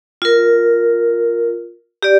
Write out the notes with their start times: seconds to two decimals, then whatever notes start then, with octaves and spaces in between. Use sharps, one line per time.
0.22 F4 A#4
2.03 G4 D5